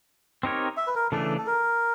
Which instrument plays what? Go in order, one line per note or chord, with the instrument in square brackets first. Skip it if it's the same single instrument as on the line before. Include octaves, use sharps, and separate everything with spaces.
[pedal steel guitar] C4 D#4 G4 A#4 C#5
[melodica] E5
B4
A#4
[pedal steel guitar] C#3 E3 A3 D4 [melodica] A4
[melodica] A4
A#4